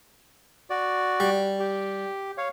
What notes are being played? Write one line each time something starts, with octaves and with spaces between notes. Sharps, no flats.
F#4 D5
G3
G4
C#5 F5